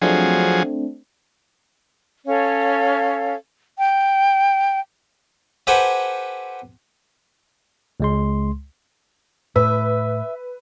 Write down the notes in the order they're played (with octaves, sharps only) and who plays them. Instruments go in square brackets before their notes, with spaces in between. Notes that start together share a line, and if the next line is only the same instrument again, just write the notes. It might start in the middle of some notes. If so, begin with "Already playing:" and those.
[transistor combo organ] F3 F#3 G#4 [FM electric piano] A3 C4 D4
[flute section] C#4 A4 C#5 F5
G5
[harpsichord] G4 A4 B4 C5 F#5 G#5
[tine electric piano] C#2 G#3 C6
[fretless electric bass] A2 [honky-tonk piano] B4 [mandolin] E5